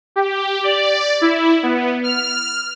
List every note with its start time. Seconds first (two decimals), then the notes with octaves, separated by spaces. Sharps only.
0.16 G4
0.63 D5
1.21 E4
1.63 B3
2.04 F6